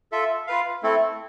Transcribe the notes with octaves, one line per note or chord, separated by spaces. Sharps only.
F4 A4 E5
F4 B4 F5
A3 C4 E4 A4